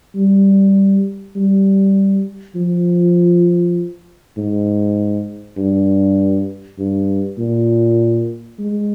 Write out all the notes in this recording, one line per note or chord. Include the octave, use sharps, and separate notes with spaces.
G3
G3
F3
G#2
G2
G2
A#2
G#3